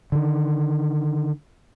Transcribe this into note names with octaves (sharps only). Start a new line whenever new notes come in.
D3 D#3